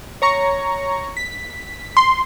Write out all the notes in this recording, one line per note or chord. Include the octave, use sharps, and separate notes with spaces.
C#5 A#5 C#6
B6
C6